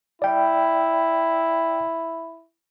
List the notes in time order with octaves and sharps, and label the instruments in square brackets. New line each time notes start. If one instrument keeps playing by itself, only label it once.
[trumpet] E4 [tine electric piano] D5 G5